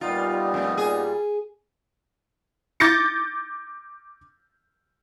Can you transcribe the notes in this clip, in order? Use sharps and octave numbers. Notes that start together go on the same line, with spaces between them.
A#2 G3 B3 D#4 F4
F2 A3
G#4
D6 G6 A6 A#6 C#7